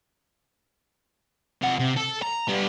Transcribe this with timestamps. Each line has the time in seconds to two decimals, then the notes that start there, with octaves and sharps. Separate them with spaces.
1.62 C3 F#5
1.79 C3
1.97 A4
2.22 A#5
2.48 G3 B3